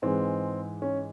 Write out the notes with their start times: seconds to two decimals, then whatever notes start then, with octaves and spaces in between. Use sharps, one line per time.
0.02 G#2 E3 G#3 C4
0.82 C#4